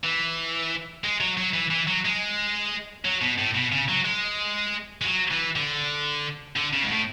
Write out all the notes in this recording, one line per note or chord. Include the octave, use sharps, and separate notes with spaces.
E3
G#3
F#3
F#3
E3
E3
F#3
G#3
F#3
B2
A2
B2
C#3
F#3
G#3
G#3
F#3
E3
D3
D3
C#3
G#2
A2